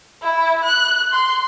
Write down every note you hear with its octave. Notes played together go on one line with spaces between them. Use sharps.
E4
F#6
C6